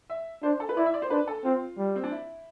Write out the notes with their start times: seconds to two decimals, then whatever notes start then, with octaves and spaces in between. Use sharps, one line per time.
0.10 E5
0.43 D4 C5
0.60 A4
0.69 B4
0.77 E4 D5
0.86 E5
0.94 D5
1.02 C5
1.10 D4 B4
1.27 A4
1.44 C4 F4
1.78 G3
1.96 C4
2.04 D4
2.12 E4